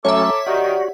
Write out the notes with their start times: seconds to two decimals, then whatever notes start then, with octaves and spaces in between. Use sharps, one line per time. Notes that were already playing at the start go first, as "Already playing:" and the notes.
0.05 F#3 A3 C#4 A4 C#5 E5 A#5 D6
0.46 D#3 F#4 G4 D5 F#5